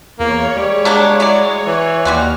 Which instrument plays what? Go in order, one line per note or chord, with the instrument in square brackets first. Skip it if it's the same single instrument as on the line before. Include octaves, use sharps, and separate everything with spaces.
[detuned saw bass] E2 [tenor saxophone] A#3 [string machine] C#5
[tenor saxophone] G3 [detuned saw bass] G#3
[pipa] B2 A#3 D4
F#3 E4 D5
[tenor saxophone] E3
[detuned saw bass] D#2 [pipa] G3 G#3 F#4 [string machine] F6